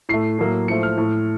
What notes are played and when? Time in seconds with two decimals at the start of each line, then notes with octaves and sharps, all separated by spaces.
0.09 A2 A3 C7
0.39 A2 F#3 A#3
0.68 A2 F3 A3 C#7
0.83 F6
0.98 A2 A3